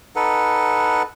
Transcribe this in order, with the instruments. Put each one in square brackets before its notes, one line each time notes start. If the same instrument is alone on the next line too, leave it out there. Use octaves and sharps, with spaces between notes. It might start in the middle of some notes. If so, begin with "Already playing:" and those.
[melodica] D#4 A4 B4 F#5